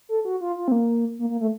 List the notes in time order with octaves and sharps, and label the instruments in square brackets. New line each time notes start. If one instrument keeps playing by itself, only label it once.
[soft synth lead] A4
F#4
F4
F4
C4
A#3
A#3
A#3
A3